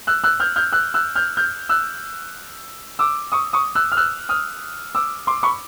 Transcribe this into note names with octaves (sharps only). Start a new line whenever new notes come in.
E6 F#6
E6 F#6
F6 G6
F6 G6
E6 F#6
E6 F#6
F6 G6
F6 G6
E6 F#6
D6 E6
C#6 D#6
C#6 D#6
E6 F#6
F6
E6 F#6
D#6 F6
D6 E6
C6 D6
B5 C#6